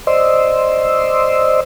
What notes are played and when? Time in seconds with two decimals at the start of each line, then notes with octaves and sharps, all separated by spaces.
0.07 C5 D5 D#5 C6 E6